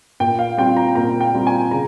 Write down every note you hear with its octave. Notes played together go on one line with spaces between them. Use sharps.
A#2 G5
F5
G3 C4 F4 G5
A#5
A#2 A#5
G5
G3 C4 F4
G#5
C#3 A#5